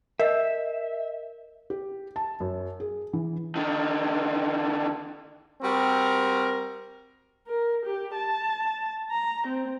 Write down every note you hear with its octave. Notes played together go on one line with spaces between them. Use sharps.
A#4 D#5 E5
G4
A5
F#2
G#4
E3
D3 D#3
G3 C4 F#4 A#4
A#4
G4
A5
A#5
C4